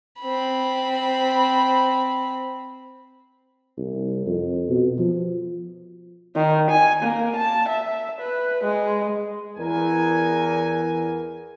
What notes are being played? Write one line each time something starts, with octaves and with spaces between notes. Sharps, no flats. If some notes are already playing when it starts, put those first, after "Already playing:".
C4 B5
C2
F2
B2
F3
D#3
G#5
A#3
A5
E5
B4
G#3
E2 A#4 G#5